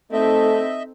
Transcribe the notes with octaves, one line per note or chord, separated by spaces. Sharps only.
A3 C4 D#4 A4 D#5 E5